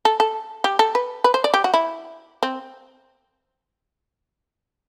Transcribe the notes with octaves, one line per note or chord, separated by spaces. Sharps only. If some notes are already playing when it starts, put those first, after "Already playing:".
A4
A4
G4
A4
B4
B4
C5
D5
G4
F#4
E4
C4